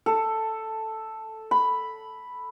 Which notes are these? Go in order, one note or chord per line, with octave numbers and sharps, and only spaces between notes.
A4
B5